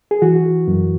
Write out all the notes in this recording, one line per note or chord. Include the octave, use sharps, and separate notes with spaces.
G#4
E3 F#4
F#2